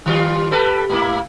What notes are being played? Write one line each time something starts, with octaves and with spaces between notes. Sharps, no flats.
D#3 G3 F4
G3 A4 B4
G#2 A#3 E4